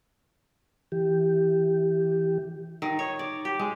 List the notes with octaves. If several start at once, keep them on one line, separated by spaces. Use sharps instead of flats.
E3 G4
D#3
C#5
D5
G4
G#3